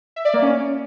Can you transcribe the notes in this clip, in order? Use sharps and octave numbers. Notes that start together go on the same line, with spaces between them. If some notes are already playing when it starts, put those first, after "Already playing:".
E5
D5
A#3
C#4